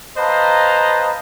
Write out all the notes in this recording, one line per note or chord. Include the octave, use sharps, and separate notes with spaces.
B4 C5 D#5 F5 A5 A#5